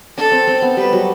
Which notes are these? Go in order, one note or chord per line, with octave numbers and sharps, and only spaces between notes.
D4 A4
C4
C4
B3
G3 B4
F#3